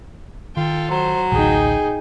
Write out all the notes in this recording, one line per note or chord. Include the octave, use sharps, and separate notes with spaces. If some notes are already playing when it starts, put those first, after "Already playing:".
D#3 F4 A4 G5
F#3 C5
A1 D2 D#4 G#4 G5